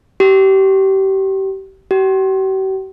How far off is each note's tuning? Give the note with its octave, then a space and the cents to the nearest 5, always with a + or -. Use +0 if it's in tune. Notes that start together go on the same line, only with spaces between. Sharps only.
G4 -30
G4 -45